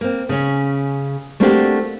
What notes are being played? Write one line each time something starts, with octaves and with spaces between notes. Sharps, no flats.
A#3 C4
C#3 C#4
A3 A#3 C4 D4 F#4 G4